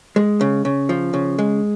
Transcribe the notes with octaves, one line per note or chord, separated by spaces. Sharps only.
G#3
C#3
C#3
F3
C#3
G#3